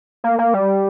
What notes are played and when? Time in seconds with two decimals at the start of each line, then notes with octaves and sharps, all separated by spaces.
0.24 A#3
0.39 A#3
0.54 G3